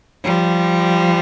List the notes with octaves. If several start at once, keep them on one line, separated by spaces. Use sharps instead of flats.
F3 G3